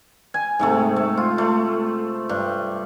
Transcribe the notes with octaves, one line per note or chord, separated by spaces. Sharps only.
G#5
G#2 C3 A3
A3
F4
A3
G2